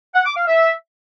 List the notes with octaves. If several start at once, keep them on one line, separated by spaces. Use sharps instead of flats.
F#5
D6
F5
E5